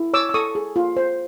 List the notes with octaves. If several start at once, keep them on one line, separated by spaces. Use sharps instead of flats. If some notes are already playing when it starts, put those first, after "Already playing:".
Already playing: E4
C#5 D6 E6
E6
A4 C#6 D#6
G#4
F4
C5